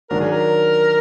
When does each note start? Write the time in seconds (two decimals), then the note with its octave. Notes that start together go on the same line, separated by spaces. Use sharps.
0.10 D#3 F#3 D4 A#4
0.20 G#4
0.32 A#4